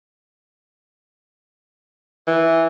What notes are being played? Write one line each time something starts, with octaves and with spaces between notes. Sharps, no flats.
E3